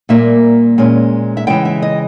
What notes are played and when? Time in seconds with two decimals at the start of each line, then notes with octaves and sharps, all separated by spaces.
0.09 A#2 G3 A#3 E5
0.78 A#2 G#3 C#4
1.37 E5
1.47 C#3 E3 G#3 G5
1.65 E5
1.82 D#5